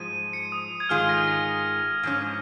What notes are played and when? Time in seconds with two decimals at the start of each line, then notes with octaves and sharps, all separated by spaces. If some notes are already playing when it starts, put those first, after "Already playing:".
Already playing: G#2 F3 G#3 D#7
0.33 C#7
0.52 D#6
0.80 G#6
0.89 G#2 D#3 G#3 F4 G#4 F6
1.09 A#6
1.27 A#6
2.03 G#2 F3 C#4